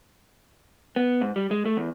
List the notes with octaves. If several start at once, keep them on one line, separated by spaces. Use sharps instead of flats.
B3
G#2
G3
G#3
A3
E2